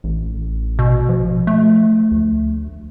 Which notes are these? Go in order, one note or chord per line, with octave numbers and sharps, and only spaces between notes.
A1
B2
F3
A3
D2